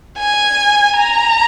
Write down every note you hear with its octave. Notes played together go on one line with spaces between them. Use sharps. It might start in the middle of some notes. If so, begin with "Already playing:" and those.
G#5
A#5